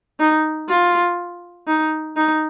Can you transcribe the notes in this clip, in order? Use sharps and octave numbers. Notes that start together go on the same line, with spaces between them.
D#4
F4
D#4
D#4